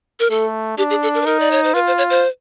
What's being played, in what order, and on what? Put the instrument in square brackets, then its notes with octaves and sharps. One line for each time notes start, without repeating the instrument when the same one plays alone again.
[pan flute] A#4
[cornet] A3 [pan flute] A4
[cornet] D4 [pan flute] G4
[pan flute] G#4
A4
A#4
B4
[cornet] D#4 [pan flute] A#4
[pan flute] D5
C#5
C5
[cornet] F4 [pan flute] B4
[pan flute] C5
C#5
C5